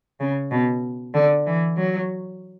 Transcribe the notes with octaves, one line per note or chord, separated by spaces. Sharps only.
C#3
B2
D3
E3
F#3